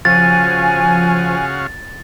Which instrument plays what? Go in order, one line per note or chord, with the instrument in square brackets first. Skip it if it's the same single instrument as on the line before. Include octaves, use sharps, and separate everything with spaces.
[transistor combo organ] C#3 F#4 F5 [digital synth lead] F3 [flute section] G#5 [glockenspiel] A6